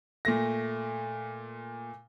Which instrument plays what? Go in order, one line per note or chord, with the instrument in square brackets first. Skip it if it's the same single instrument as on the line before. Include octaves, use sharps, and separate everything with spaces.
[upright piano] A#2 A3 A#6